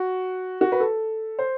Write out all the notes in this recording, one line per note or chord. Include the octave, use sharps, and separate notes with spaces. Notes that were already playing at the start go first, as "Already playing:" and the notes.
Already playing: F#4
F#4
B4
A4
C5